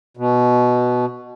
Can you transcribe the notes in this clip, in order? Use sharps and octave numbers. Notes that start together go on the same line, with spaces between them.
B2